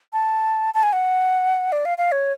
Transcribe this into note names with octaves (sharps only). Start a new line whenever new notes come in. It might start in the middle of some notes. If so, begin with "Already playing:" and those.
A5
A5
G#5
F#5
D5
F5
F5
C#5